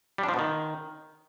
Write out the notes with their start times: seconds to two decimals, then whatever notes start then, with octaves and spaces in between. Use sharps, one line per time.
0.18 G3
0.23 D4
0.29 F3
0.34 B2
0.39 D#3